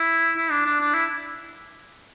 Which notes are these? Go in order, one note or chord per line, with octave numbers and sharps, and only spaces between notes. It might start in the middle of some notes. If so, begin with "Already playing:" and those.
Already playing: E4
E4
D4
D4
D4
E4